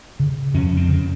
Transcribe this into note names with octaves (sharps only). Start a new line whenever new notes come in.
C#3
F2 C#4
C4
C#3